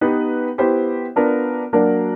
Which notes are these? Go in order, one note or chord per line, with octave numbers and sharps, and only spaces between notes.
B3 D#4 G4 B4
B3 E4 G4 C5
B3 D4 F4 A#4
F#3 A#3 D4 F#4 A#4